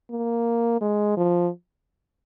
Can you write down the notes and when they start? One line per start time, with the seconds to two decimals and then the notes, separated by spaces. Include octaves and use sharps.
0.11 A#3
0.81 G#3
1.17 F3